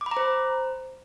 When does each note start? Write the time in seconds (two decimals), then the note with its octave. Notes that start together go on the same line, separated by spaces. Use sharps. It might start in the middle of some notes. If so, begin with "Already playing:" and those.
0.01 D6
0.06 B5
0.11 A#5
0.17 C5